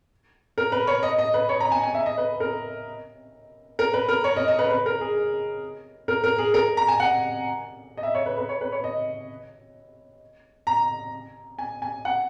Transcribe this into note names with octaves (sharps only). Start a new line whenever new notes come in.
A#4
B4
C#5
D#5
D#5
B4
C#5
A#5
G#5
G#5
E5
D#5
B4
A#4
A#4
B4
A#4
C#5
D#5
D#5
B4
B4
A#4
G#4
A#4
A#4
G#4
A#4
A#5
G#5
F#5
D#5
E5
C#5
B4
B4
C#5
B4
C#5
D#5
A#5
G#5
G#5
F#5